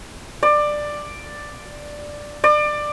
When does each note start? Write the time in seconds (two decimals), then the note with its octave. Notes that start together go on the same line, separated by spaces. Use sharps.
0.43 D5
2.44 D5